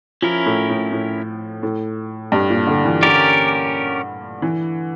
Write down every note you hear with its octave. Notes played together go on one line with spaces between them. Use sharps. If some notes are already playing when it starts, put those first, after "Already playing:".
F3 C#4 E4 A#4
A2
A2
A2
A2
G2
A#2
D3
E3
D3 C#4 G4 A#4 D5
E3